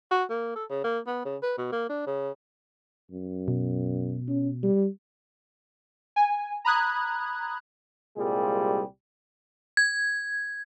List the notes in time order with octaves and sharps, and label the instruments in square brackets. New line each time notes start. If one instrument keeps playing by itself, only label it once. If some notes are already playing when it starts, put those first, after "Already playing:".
[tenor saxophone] F#4
A#3
A4
C#3
A#3
B3
C#3
B4
B2
A#3
D4
C#3
[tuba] F#2
[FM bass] B2
[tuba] C#4
G3
[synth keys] G#5
A#5 B5 D#6 F#6 G#6
[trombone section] C2 A#2 G3 G#3 G#4
[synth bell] G#6